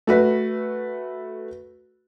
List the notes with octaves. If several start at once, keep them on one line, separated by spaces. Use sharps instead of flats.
A3 F#4 B4